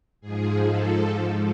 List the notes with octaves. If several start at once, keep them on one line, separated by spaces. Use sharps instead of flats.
G#2 F3 G#4
A4